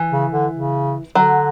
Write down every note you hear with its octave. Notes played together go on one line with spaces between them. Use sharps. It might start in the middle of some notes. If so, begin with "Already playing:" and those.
Already playing: E3
C#3
D3
C#3
D3 F#3